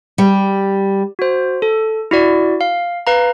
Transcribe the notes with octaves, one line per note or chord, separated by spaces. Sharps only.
G3
F#4 C5
A4
E4 F#4 D5
F5
B4 F5 A#5